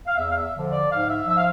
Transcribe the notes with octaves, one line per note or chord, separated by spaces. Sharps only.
F5
E2 E5
F5
E5
D3 F3
D5
G#2 F5
E5
F3 E5
F5